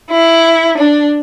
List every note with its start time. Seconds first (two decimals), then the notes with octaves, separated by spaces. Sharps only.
0.10 E4
0.76 D4